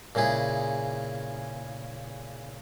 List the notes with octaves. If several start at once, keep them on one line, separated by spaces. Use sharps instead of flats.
A#2 C#3 E4 G#4